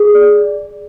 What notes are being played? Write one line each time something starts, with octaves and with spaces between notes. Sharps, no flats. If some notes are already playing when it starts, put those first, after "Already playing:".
Already playing: G#4
D5